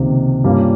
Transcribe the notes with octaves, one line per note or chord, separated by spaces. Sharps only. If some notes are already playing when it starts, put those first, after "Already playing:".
Already playing: C#2 C3 D#3 A#3
G2 G3 A#3 C#4 F4